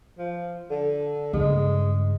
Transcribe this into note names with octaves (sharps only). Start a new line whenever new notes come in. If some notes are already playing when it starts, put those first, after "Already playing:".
F3
D3
G2 C#3 G#3